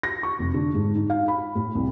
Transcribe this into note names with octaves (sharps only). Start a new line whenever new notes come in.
A#6
C#6
F1
D3
G#2
D#4
F5
B5
A2
C2